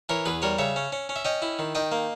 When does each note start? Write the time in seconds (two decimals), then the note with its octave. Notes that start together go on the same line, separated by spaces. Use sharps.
0.09 E3 A#4 C#5
0.26 E2 G#4 B4
0.42 G3 A#4 C#5
0.58 C#3 C#5 E5
0.76 C#4
0.92 C#4
1.09 C#4
1.16 E5
1.25 C#4 D#5 G5
1.42 E4
1.59 D#3
1.75 D#3 D#5 G5
1.92 A#3